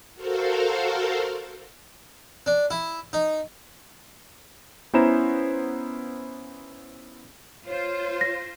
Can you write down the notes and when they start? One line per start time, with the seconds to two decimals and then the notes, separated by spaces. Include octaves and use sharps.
0.14 F#4 A4 A#4 C5 F5
2.46 D4
2.71 E4
3.13 D#4
4.94 B3 C#4 E4 C5 A#5 E7
7.67 F4 C5 C#5
8.21 A#6